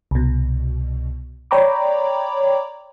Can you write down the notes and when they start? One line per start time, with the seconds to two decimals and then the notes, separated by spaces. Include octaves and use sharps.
0.11 C2 B2
1.51 C#5 D5 G5 A#5 B5 D6